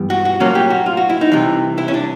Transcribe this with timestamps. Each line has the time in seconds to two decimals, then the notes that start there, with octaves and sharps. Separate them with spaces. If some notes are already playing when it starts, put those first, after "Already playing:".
Already playing: G2 E3 G3 B3
0.10 F#4
0.25 F#4
0.40 A2 F#3 A#3 C#4 F4
0.55 G4
0.70 F#4
0.86 F4
0.97 F#4
1.10 E4
1.21 D#4
1.32 C2 C3 E3
1.78 E4
1.88 C#4
1.94 D4